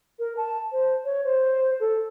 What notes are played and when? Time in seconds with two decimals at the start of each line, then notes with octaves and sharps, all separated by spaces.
0.19 A#4
0.37 A5
0.72 C5
1.05 C#5
1.24 C5
1.80 A4